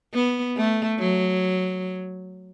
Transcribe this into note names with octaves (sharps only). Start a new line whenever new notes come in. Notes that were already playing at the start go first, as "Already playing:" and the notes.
B3
A3
F#3